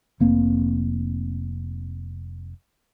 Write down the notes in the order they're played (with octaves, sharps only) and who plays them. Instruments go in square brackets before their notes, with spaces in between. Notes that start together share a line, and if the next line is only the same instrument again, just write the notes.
[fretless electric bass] F1 A#3 C4